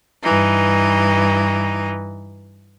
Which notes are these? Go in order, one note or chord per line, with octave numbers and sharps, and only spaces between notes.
G2 E3 D#4